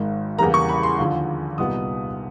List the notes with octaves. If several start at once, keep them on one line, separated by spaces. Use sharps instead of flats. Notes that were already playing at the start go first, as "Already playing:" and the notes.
Already playing: G#1 G#2 D#3
E2 C#3 E3 G3 A#3 A#5
C#6
B5
C6
D#2 D3 F3
C2 A#2 G3 B3 D#4 D#6